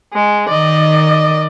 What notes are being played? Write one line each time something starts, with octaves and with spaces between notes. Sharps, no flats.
G#3
D#3 D5 D#5